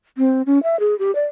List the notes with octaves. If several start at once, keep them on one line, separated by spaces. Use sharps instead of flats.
C4
C#4
E5
G#4
G4
D5